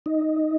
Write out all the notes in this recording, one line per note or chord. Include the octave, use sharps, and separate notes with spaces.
D#4